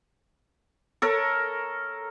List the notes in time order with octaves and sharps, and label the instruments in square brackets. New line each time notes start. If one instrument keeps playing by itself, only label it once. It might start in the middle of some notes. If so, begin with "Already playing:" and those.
[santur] A4 A#4 C#5